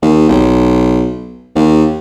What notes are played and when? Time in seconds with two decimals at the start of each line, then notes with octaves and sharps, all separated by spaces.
0.02 D#2
0.29 B1
1.56 D#2